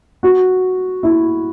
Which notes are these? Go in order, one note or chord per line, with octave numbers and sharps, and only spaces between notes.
F#4
E4